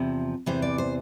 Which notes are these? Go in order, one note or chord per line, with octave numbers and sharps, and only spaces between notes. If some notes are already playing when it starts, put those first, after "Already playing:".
Already playing: E2 C3 F3
E2 C3 E3 C5
D5
C5